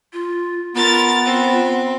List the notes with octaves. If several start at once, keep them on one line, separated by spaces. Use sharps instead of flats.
F4
B3 F4 A#4 A6
C4